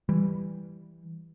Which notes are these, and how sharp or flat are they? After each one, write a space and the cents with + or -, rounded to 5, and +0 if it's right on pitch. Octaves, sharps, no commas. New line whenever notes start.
E3 +0 G3 +0